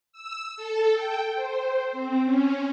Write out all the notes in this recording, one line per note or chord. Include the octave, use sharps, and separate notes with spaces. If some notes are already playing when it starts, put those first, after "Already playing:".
E6
A4
G5
C5
C4
C#4